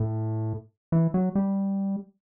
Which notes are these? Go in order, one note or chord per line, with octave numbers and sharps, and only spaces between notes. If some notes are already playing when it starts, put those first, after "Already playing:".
Already playing: A2
E3
F#3
G3